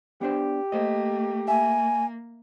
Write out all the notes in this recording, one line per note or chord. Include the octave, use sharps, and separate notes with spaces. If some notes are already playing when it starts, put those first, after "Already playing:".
B3 D4 G4 C5
A3 A#3 C5 D#5
A#3 E5 G#5